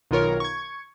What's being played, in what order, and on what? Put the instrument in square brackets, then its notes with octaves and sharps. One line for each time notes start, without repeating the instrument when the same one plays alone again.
[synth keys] B1 D#3 F4 A#4 C#5
C#6 G#6